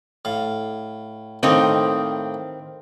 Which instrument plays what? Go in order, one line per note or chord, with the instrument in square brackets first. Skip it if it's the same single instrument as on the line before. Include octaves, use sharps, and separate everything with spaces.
[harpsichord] A2 F5
[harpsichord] A2 A3 A#3 [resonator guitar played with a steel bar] D#3 C4